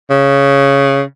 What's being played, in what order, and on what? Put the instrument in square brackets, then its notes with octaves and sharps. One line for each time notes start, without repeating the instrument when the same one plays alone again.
[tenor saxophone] C#3